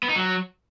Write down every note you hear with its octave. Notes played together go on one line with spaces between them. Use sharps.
B3
D#4
F#3